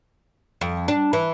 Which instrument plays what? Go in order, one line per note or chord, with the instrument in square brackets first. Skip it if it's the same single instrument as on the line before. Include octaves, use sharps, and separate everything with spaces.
[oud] F2
D4
E3